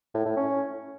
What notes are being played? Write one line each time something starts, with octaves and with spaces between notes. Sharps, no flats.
A2
A2
C#4